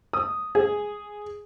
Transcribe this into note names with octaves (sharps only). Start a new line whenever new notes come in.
D#6
G#4